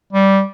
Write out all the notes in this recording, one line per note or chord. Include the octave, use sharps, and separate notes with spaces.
G3